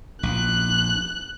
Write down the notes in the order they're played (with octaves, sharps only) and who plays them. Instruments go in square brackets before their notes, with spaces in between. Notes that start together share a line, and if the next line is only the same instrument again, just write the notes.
[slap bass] A#1 [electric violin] F#6